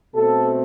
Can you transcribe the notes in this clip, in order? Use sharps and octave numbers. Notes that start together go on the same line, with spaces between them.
B2 A3 C4 A4